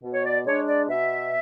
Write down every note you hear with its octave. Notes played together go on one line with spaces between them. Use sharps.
B2
C#5
D5
G#3 D4 C#5
D5
B2 E5